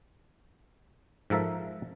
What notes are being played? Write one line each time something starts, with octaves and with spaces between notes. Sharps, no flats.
G#2 F3 A4 A#4 E5